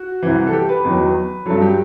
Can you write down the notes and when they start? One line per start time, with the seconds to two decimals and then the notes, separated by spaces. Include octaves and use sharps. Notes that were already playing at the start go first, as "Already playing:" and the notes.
Already playing: F#4
0.22 C2 C3 E3
0.47 A4
0.53 G4
0.69 B4
0.85 E2 D#3 F#3
1.46 G2 F#3 A4
1.62 G4